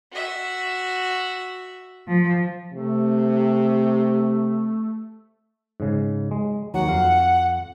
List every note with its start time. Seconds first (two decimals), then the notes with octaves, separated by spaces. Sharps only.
0.12 F#4 E5
2.08 F3
2.73 C3 A3
5.80 G#2 C#3
6.31 G#3
6.74 D#2 F#3 F#5
6.88 F2 F5